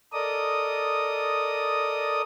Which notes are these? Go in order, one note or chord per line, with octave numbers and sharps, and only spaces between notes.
A4 A#4 D5 D#5 D#6